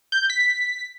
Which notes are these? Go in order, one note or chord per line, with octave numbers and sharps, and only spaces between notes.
G6
B6